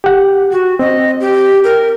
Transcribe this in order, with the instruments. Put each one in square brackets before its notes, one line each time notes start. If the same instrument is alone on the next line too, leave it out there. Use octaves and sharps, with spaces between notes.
[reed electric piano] G4 F#5
[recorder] F#4
[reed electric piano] C4 [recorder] D#5
[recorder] G4
A#4